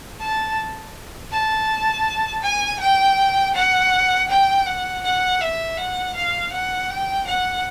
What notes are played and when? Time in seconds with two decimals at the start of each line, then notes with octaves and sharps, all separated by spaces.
0.20 A5
1.32 A5
2.43 G#5
2.80 G5
3.55 F#5
4.30 G5
4.66 F#5
5.03 F#5
5.41 E5
5.77 F#5
6.15 F5
6.53 F#5
6.90 G5
7.27 F#5